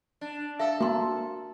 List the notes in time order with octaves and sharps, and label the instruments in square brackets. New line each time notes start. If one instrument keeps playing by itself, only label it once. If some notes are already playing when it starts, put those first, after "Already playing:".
[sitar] D4
[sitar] A4 [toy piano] E5 F5 E6
[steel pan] A#3 [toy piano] F#4 C6